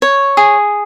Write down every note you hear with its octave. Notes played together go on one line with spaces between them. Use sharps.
C#5
G#4